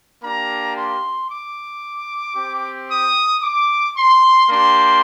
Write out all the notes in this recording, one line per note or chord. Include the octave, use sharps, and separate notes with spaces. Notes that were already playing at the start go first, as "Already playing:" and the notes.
A#3 D4 G4 A#5
C6
D6
C4 G4
D#6
D6
C6
A#3 D4 G4 C6